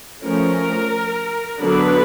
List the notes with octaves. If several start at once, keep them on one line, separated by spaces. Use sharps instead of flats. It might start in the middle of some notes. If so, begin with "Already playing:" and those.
F3 A3 C#4 A#4
D3 F#3 B3 D4 B4